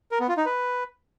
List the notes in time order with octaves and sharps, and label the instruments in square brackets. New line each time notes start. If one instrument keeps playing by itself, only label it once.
[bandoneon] A#4
B3
F4
D#4
B4